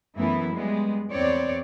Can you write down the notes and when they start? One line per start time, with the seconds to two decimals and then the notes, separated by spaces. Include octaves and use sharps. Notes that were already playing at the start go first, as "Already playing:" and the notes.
0.16 F#2 E3 A3 B3 E4
0.52 G3 G#3 B3
1.11 E2 C4 C#5 D5